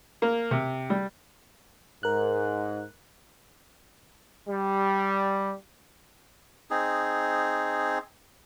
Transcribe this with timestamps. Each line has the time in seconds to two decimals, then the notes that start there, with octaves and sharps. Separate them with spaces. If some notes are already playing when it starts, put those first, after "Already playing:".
0.22 A#3
0.51 C3
0.90 G3
2.03 G#2 A#4 F#6
4.48 G3
6.70 C4 D#4 G#4